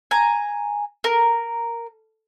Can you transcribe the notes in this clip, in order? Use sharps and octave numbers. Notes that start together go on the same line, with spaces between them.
G#5 A#5
A#4